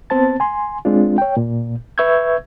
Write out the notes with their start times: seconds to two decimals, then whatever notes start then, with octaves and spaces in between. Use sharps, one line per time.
0.10 B3 C4 C5 A5 A6
0.40 G#5 C6
0.85 G#3 C4 D4 F4
1.18 C#5 G5
1.37 A#2
1.98 B4 E5 C#6 E6 G6 G#6